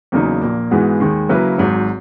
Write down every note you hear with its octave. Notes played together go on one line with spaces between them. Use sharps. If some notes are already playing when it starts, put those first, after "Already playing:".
E2 C#3 F#3 A#3 D#4
A#1 A#2 A#3
G#2 E3 G#3 B3 F#4
D#2 D#3 G#3
C#3 F#3 A#3 E4 B4
G#1 G#2 F#3